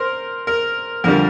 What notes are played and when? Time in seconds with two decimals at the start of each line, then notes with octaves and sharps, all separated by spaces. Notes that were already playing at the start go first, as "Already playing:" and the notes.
Already playing: A#4 C5
0.47 A#4
1.04 F2 D3 G3 A#4